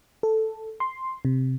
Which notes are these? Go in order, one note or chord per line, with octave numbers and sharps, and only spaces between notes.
A4
C6
C3